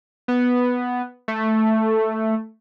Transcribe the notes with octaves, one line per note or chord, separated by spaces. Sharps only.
B3
A3